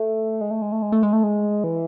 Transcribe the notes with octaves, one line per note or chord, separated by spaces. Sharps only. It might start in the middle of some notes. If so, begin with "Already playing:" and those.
Already playing: A3
G#3
A3
G#3
A3
G#3
A3
G#3
A3
G#3
E3